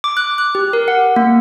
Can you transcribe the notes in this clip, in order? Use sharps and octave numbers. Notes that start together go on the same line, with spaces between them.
D6
F#6
F#6
G4
A#4
F#5
A#3